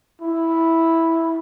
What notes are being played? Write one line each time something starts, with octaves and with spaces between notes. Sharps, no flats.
E4